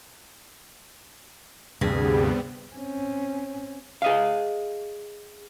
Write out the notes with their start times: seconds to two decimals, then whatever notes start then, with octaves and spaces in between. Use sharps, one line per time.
1.81 D2 G2 C3 G3 B3 C4 G#4
2.73 C4 C#4
4.02 G#4 D#5 F5